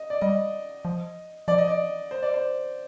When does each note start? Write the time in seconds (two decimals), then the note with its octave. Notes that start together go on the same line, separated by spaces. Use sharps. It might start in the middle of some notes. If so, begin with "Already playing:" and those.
Already playing: D#5
0.10 D5
0.21 G3 D#5
0.85 F3
1.48 F3 D5
1.58 D#5
1.68 D5
2.11 C5
2.22 D5
2.34 C5